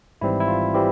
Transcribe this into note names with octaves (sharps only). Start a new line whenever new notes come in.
G#1 G#2 E3 G3 C4 E4
E4
F4
E3 G3 C4 G4